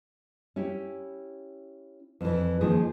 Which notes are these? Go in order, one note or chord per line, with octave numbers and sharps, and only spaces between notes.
C#4 E4 G4
F2 E3
D#3 F3 A#3 G#4